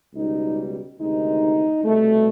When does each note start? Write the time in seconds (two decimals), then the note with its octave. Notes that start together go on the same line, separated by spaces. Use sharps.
0.14 C#2 B2 G3 D#4
0.99 D2 C3 D#3 G#3 D#4
1.83 C2 B2 G3 A3